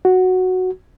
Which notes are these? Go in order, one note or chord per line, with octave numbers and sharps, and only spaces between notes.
F#4